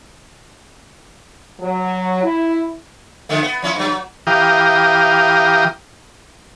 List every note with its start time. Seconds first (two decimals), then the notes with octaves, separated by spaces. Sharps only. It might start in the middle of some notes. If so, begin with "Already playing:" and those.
1.60 F#3
2.23 E4
3.29 D3 F3 A3
3.43 B3
3.62 F3 C#4 E4
3.75 G2 F#3
3.89 F#3
4.27 E3 G4 F5 G5 A#5 D#6